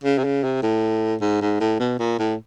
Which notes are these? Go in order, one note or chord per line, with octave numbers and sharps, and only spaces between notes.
C#3
C3
C#3
C3
A2
G#2
G#2
A2
B2
A#2
A2